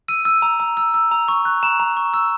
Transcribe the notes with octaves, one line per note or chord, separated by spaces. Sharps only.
E6 D#7
E6
A#5
A#5
E6
E6
A#5
C#6
F#6
A#5 E7
A#5
C#6
E6